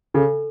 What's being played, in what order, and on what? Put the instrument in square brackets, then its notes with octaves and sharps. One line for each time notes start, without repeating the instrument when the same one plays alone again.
[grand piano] C#3 [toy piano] A4